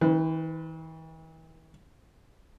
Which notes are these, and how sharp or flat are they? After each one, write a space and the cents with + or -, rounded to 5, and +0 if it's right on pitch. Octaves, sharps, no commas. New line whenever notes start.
E3 -45 B4 +25